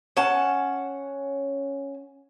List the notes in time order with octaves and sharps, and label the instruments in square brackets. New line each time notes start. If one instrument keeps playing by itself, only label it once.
[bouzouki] C#4 F#5 A5